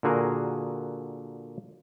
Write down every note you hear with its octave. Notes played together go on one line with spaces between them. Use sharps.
A#2 D3 F#4 G#4 A#4